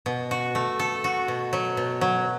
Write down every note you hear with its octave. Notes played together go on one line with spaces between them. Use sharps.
B2
F#4
A3
A4
F#4
B2
F#3
B2
F#3